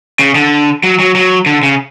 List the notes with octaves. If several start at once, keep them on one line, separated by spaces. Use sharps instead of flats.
C#3
D3
F#3
F#3
F#3
D3
C#3